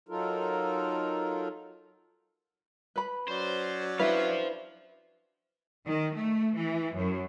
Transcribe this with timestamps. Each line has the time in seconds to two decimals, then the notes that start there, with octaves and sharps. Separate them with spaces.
0.09 F#3 D#4 F4 A4 A#4
2.96 B4 B5
3.28 F#3 C#4 C5 D5
3.99 D4 E4 B4 C5 F5
5.85 D#3
6.15 A3
6.56 E3
6.96 F#2